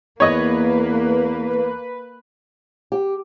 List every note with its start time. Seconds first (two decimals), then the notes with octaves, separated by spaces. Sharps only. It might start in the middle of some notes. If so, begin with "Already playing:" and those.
0.20 E2 A#3 B4 C#5 D#5 D#6
2.92 G4